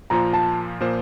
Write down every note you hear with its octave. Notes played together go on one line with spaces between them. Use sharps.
A#2 F3 A#3 F4 C5 A#5
A5
A#2 F3 A#3 F4 C5